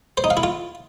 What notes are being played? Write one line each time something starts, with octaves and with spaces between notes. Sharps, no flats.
C5
D#4
F5
E4
F4